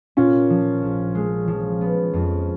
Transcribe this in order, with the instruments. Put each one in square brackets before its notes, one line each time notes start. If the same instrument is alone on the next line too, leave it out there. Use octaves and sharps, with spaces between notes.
[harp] A#2 [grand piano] C#4 F4
[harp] F3
A#1
G#3
F3
B3
F2